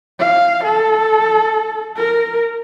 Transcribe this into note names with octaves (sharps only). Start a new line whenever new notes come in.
F5
A4
A#4